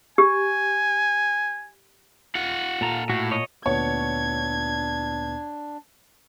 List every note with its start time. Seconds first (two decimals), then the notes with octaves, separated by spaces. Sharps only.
0.18 G4 G#5
2.35 F4 F#5
2.81 A#2 A4 A#5
3.10 A2 F#4
3.32 C#5 D#5
3.66 D2 A#2 B3 D4 C#5 G#6